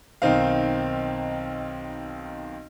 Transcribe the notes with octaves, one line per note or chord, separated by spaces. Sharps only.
B1 D#3 C4 D#4 F5